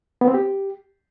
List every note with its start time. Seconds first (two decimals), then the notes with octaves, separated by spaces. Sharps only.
0.21 B3
0.28 C4
0.34 G4